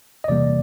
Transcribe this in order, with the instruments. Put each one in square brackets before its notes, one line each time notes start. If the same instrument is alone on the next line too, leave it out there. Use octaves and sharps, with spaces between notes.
[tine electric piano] D#5
E2 C3 E3 G3 A#3 D5